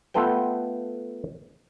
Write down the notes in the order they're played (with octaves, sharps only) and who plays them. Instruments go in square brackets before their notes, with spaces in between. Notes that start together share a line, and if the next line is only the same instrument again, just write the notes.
[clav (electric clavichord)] A3 B3 F4 A4 B4 G5